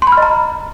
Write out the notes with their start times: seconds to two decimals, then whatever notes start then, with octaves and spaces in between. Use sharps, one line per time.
0.02 C6
0.07 B5
0.12 F6
0.17 D#5
0.22 A#5